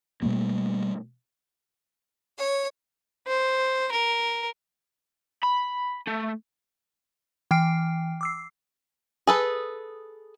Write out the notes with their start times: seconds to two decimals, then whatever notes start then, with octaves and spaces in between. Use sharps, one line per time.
0.22 B2 G3 A3 A#3
2.37 C#5
3.27 C5
3.92 A#4
5.43 B5
6.08 A3
7.51 E3 G5 F6 C7 D7
8.21 D6 E6 C7
9.27 G#4 A4 B4